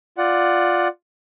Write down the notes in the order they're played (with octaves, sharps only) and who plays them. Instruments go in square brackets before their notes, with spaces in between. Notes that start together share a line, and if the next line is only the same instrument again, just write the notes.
[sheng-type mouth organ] F4 D5 F#5